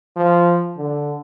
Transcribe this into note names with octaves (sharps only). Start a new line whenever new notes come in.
F3
D3